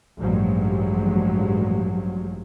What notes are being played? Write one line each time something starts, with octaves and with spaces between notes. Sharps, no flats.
A1 G2 F3 F#3 G#3